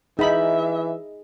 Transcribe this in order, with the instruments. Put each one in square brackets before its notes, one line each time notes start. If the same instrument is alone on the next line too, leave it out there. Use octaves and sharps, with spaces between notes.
[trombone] E3 [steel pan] D#4 B5 [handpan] G#4 D#5 [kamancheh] E5